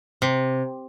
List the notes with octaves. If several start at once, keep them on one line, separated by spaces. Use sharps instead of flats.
C3